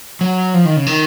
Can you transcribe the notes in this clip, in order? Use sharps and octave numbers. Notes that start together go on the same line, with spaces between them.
F#3
F3
D#3
C#3
D#3